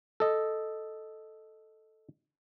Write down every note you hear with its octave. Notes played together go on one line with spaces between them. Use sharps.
A4 D#5